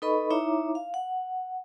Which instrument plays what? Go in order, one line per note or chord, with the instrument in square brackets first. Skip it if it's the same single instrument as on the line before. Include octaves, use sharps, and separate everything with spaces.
[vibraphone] D#4 A4 B4 D#5 B5 C#6
D#4 E4 C#5 E5 A#5 D6
F5
F#5